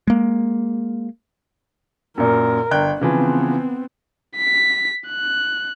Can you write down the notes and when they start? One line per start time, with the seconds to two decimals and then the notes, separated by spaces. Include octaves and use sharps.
0.07 G#3 A#3
2.18 F#2 A#2 A#4
2.71 G1 G5 F#6
3.01 C#3 E3 F3 B3 C4
4.36 B6
5.08 F#6